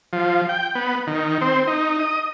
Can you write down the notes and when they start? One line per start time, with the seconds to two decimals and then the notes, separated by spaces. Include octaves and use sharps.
0.13 F3
0.49 G5
0.75 B3
1.07 D#3
1.41 C4
1.67 D#4
1.99 D#5